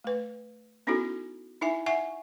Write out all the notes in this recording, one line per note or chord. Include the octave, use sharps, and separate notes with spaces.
A3 B4
B3 C#4 D#4 E4 F#4 A4
D#4 E4 E5 G#5
E5 F#5 G#5 C#6